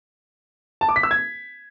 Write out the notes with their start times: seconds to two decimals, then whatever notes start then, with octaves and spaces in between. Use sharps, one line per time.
0.81 A5
0.89 D6
0.96 B6
1.03 E6
1.11 G#6